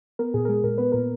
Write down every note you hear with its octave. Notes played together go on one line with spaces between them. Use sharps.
B3 A#4
A#2 G#4
A#4
G#3 G#4
A#2 A#4
B3 B4
A#2 A#4